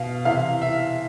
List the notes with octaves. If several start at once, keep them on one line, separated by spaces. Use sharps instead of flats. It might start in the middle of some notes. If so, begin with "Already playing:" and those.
Already playing: B2 F5
C3 E3 F5
E5